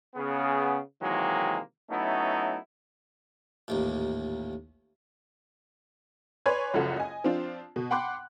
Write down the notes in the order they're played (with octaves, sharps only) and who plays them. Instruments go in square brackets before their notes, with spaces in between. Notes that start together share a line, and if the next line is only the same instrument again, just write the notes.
[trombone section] C#3 B3 G#4
C3 D#3 E3 F#3 G#3 A#3
F#3 A3 B3 C#4 D#4 E4
[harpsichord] A1 D#2 A#2
[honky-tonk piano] B4 C#5 D5 G#5 C6 G#6
F#1 C#2 F#2 F3 A4 F#5
D#5 G#5
F3 C4 D4 F4
B2
F#5 G5 B5 C6 D6 F#6